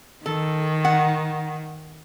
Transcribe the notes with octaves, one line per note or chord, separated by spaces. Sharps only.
D#3 A4
F#5